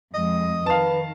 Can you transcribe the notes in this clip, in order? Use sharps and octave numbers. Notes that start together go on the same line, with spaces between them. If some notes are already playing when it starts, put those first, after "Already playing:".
F2 G#3 D#5
D#3 B4 F5 A5